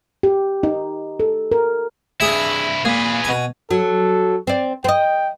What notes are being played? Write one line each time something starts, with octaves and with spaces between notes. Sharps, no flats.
G4
D#4
A4
A#4
G2 D4 E4 G#4 E5
A#2 G#4 B4
B2 G#5
F#3 A4
C4 D5
C4 D#5 G5